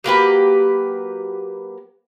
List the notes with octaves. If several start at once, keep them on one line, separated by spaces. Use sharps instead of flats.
F#3 A#3 G4 B4